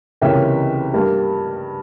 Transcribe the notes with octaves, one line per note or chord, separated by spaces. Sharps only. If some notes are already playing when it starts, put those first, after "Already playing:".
C#2 C3 E3 A#3 C#4 E5 G5
G2 G3 A#3